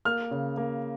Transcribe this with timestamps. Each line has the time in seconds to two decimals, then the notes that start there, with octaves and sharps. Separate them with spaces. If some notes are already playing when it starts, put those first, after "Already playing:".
0.05 A#3 F6
0.31 C#3
0.57 A#3